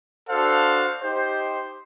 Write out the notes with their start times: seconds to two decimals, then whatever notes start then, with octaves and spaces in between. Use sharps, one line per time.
0.29 D4 F#4 A4 C5 F5
1.01 D#4 G4 C5